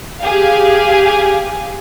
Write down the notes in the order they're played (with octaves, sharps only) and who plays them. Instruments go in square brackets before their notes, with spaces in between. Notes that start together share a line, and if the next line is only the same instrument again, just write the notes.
[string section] G4 G#4 F5